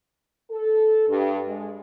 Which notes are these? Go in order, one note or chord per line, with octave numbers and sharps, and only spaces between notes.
A4
G2
G#3